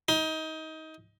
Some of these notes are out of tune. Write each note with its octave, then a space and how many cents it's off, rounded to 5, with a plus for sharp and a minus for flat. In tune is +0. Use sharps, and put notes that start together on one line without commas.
D#4 +25